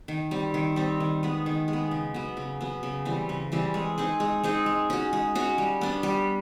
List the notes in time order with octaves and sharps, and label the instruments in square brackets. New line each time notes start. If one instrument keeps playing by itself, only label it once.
[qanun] D#3
G3 C4
D#3
G3 C4
D#3
G#3 B3
D#3
G#3
B3
C#3
F#3 B3
C#3
F#3 B3
C#3
E3 G3 C4
C#3
E3 G3 C4
G#3
C4 D#4 G#4
G#3
C4 D#4 G#4
G#3
C#4 F#4
G#3
C#4 F#4
G3
B3 D4
G3